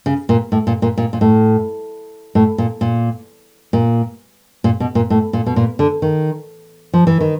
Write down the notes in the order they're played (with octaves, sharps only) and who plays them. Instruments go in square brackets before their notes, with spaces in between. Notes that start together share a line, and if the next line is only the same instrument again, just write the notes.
[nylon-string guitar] C#3
A#2
A2
A#2
A#2
A#2
A#2
A2
A2
A#2
A#2
A#2
A#2
B2
A#2
A2
A#2
B2
A#2
D3
D#3
F3
E3
D#3